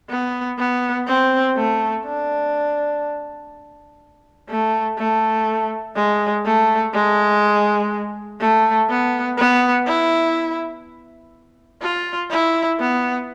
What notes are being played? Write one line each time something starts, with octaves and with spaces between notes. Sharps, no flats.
B3
B3
C4
A3
D4
A3
A3
G#3
A3
G#3
A3
B3
B3
E4
F4
E4
B3